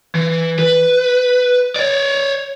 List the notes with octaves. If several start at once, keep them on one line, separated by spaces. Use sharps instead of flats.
E3
B4
C#5 D5